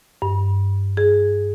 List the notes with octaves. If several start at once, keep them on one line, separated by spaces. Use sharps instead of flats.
G2
G#4